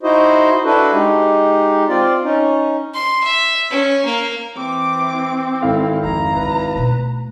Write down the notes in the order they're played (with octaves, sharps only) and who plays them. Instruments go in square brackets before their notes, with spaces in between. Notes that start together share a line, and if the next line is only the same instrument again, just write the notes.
[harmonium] D#4 E4 F#4 C5 D#5
D4 E4 F#4 A4 B4
G#3 D#4 G4
C4 F4 D5
C#4 D#4
[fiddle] C6
E5
C#4
A#3
[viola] E3 D6 [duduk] C4
[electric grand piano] G#1 E4 F5 [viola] A4
[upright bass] F2 [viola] A#5
[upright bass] C2 [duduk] B4
[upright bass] B2 A3